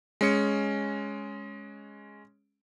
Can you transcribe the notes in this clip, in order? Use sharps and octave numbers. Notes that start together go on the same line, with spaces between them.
G#3 C#4 C#7